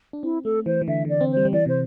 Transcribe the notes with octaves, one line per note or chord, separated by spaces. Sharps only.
D4
C4 E4
A3 A4
E3 C5
E3
D3 E5
D3 D5
C4
G3 C5
G3
E3 D5
C3 C5